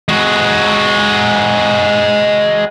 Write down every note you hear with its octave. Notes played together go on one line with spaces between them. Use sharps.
G#3 F#4